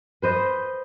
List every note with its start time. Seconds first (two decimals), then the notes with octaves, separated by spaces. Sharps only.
0.22 B4 C5 D#5